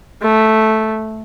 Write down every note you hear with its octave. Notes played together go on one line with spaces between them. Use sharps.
A3